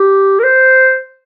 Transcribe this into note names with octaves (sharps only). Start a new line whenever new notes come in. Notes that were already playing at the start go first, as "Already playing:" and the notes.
Already playing: G4
A#4
C5